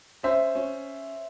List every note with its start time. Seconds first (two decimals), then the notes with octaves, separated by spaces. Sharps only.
0.23 C#4 C5 E5
0.55 C#4